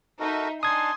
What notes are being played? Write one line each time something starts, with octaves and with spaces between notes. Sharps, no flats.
D#4 F#4 A4 A#4 E5
D4 D#4 G#5 A5 C6 D#6 G#6